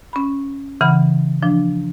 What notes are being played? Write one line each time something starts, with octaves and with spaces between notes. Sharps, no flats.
C#4 B5
C#3 E3 F#5 B5
F3 D4